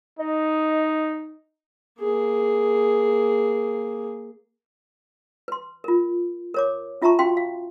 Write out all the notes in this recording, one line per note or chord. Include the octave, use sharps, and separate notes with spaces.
D#4 D#5
A#3 G#4
B4 C6
F4 A#4
A#4 C#5 D6
C#4 F4 E5 A5 A#5 C#6
C#4 F#4 F5 G5 C6
F5